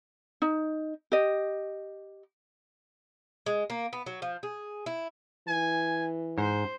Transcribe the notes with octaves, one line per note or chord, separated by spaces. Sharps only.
D#4
G4 D#5
G#3
A#3
B3
F#3
F3
G#4
E4
E3 G#5
G#2 C5